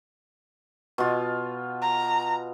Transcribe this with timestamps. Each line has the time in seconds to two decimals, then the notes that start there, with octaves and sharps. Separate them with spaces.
0.98 B2 F4
1.82 A#5